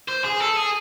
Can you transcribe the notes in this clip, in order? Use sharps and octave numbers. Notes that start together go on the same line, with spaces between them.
C5
G#4
A4
G#4